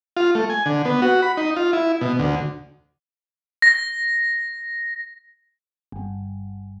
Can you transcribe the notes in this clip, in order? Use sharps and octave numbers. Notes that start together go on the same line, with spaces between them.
F4
A3
G#5
D3
B3
F#4
B5
D#4
F4
E4
B2
D2
A#6
G1